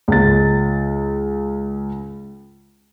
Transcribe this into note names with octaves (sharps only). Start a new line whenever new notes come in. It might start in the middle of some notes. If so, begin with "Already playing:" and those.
C#2 A6